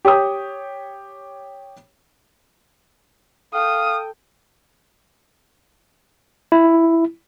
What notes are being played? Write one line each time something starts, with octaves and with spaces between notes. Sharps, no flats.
G4 C#5 G5 D#6
A4 F5 G5 D#6
E4